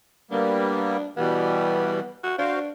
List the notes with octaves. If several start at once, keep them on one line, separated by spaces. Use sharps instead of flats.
G3 A#3 B3 D4
B2 E3 G3 B3
F#4
D4 F#4 C5 F5